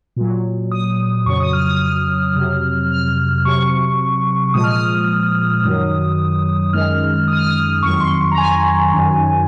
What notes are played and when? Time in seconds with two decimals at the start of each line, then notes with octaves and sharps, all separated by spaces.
0.16 A#2 F#3
0.72 D#6
1.26 F2 C#3 F#3 C#6
1.40 D#6
1.53 F6
1.67 D#6
1.81 F6
2.36 F2 C3 F#3
2.91 F6
3.45 C3 F#3 C#6
4.54 A#2 F3 G#3 D#6
4.64 F6
4.72 D#6
5.64 F#2 D#3 F#3
6.73 F#2 D#3 G#3 F6
7.28 D#6
7.37 F6
7.47 D#6
7.83 F2 D#3 F#3 C#6
7.96 C#6
8.00 C6
8.32 A#5
8.38 G#5
8.92 F#2 D#3 F#3